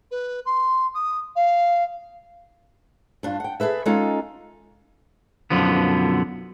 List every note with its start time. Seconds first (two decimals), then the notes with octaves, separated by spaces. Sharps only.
0.11 B4
0.45 C6
0.94 D#6
1.35 F5
3.23 G2 D4 F4
3.40 F#5 G5
3.60 G#4 A4 B4 E5
3.85 G#3 C#4 D#4 F4 A4
5.50 B1 F#2 D3 F3 B3